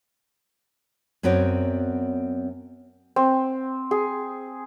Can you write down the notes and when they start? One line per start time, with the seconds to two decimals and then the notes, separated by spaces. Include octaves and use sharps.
1.23 F#2 B3 C4 F#4 C#5 D5
3.16 C4
3.91 G#4